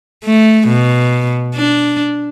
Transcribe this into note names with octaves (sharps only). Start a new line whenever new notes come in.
A3
B2
D4